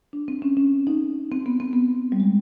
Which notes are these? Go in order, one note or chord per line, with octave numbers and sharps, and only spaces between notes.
D4
C4
C#4
C#4
D#4
C4
B3
C4
B3
G3
G#3